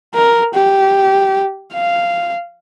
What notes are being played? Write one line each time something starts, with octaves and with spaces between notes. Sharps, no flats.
A#4
G4
F5